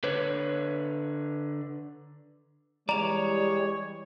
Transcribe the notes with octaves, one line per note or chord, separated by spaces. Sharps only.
D3 B4 C#5
E3 G3 G#3 C#5 D5 A#5 F7